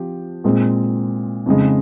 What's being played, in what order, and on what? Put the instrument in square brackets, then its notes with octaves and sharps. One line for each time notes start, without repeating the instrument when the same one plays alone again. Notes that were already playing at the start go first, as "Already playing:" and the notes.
Already playing: [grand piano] F3 C4 G4
A#2 G#3 C4
F2 C#3 G#3